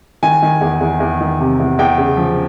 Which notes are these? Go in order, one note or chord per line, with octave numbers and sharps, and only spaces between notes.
D#3 G#5
D#3
E2
E2
E2
D#3
C3
E2
E2 G5
C#3
F3